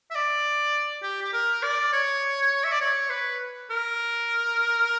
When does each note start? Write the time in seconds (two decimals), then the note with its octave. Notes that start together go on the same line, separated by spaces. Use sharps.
0.10 E5
0.15 D5
1.03 G4
1.22 G4
1.33 A#4
1.62 D5
1.93 C#5
2.64 E5
2.72 D5
2.81 C#5
3.10 B4
3.70 A#4